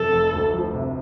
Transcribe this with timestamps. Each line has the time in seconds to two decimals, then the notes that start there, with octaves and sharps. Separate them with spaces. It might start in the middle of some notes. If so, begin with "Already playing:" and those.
Already playing: F2 C3 A4
0.12 F1
0.33 D2
0.53 F3
0.74 C3